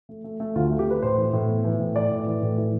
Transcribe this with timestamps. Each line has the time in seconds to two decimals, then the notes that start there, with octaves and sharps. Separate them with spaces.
0.09 A3
0.24 A3
0.40 A3
0.55 D2 F4
0.71 A3
0.79 G4
0.87 A3 B4
1.02 A2 C5
1.18 E3
1.33 A2
1.49 B3
1.65 E3
1.80 A2
1.96 E3 D5
2.11 A2
2.27 E3
2.42 A2
2.58 E3